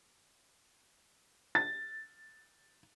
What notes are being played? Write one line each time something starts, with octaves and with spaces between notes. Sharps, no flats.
A6